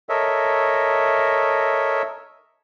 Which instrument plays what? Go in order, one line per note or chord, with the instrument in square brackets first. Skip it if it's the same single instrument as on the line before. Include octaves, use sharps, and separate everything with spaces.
[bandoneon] A4 A#4 C#5 D#5 E5